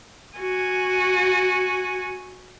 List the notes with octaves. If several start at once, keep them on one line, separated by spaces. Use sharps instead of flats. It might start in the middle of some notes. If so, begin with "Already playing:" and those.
F#4 G#5